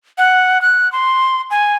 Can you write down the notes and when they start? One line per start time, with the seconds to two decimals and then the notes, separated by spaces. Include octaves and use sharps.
0.18 F#5
0.62 F#6
0.92 C6
1.51 G#5